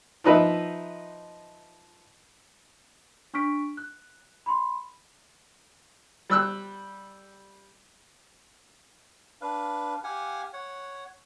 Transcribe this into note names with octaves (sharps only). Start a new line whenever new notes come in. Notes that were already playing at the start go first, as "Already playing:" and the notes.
F3 D#4 B4 E5
D4 C#6 F6 B6 D7
F#6
B5 C6
G3 E6 F#6
D4 B4 F5
G4 F5 F#5 G#5
C#5 F#5